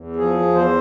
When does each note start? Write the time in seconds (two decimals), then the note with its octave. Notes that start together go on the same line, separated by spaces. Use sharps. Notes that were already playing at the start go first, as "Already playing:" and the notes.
Already playing: E2
0.16 F3 G#4
0.42 E2
0.55 C5